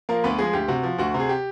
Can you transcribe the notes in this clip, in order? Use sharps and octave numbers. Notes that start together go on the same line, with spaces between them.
F3 A#3 A#4
D2 B3 B4
F3 G#3 G#4
D2 G4
C3 F#4
F3
D2 F#4
C3
G#4
G4